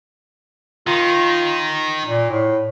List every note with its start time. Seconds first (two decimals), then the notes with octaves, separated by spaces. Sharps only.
0.87 D#3 F4
2.07 A#2
2.30 A2